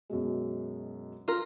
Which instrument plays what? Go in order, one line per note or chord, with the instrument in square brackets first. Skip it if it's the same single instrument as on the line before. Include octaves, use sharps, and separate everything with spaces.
[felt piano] F#2 B2 G#3
[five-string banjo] F4 A#4